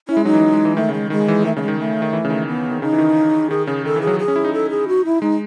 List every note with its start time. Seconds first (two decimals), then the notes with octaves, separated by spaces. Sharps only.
0.08 C#4 E4
0.17 G#3
0.25 F#3 D#4
0.33 E3
0.42 F#3
0.53 G#3
0.65 E3
0.76 D#3 A3
0.89 C#3
0.93 G#3
1.10 D#3 G#3
1.28 E3
1.44 D#3 A3
1.57 C#3 A3
1.62 G#3
1.68 D#3
1.80 A3
2.02 D#3
2.13 E3
2.25 C#3
2.30 D#3
2.47 B3
2.71 D#3
2.82 C#3 D#4
2.93 E3
2.98 D#3
3.50 D#3 G#4
3.67 C#3 G#4
3.85 D#3 A4
3.96 E3
4.01 G#4
4.07 F#3
4.19 G#4
4.28 C#4
4.36 E4
4.44 D#4
4.54 A4
4.70 G#4
4.88 F#4
5.05 E4
5.22 G#3 D#4